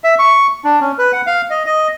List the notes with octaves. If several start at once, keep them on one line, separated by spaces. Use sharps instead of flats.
E5
C#6
D4
C#4
B4
F#5
F5
D#5
D#5